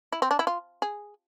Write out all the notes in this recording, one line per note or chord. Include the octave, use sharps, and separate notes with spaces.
E4
C4
D4
E4
F4
G#4